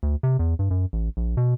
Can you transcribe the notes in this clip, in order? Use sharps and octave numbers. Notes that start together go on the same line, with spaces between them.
D2
C3
E2
G2
F#2
A1
A#1
B2